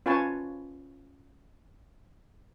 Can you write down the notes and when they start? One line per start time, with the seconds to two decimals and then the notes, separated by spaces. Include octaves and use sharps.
0.06 C#4 F4 B4 C#5 G#5 A5